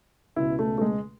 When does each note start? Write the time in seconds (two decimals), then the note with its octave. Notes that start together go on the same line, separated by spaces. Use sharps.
0.36 C#2 B2 E4
0.59 A3
0.78 A3
0.81 G#3